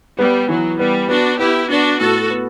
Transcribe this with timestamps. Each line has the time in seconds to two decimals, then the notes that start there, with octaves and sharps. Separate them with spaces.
0.19 G3 B3
0.49 E3 F#3
0.79 G3 B3
1.09 B3 D4 F#4
1.39 B3 E4 G4
1.69 B3 D4 F#4
2.00 A2 F#4 A4
2.30 B3